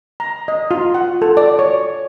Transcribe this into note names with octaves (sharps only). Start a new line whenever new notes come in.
A#5
D#5
F4
F#5
A4
D5
C#5